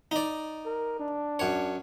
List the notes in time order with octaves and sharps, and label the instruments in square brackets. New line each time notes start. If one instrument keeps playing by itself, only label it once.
[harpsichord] D#4 D5
[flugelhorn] A#4
D4
[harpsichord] F#2 C#5